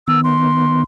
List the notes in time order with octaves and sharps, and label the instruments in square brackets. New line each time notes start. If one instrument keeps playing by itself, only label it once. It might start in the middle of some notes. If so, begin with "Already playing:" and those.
[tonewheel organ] D#3 B3 [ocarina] E6
[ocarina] C6